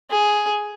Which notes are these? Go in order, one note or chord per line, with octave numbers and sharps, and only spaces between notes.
G#4